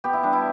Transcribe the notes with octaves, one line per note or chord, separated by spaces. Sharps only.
B3 G4
E4
G3 D4
E4